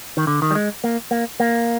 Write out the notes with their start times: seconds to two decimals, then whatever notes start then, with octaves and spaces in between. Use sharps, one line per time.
0.17 D#3
0.27 D3
0.42 D#3
0.51 G3
0.55 G#3
0.84 A#3
1.11 A#3
1.40 A#3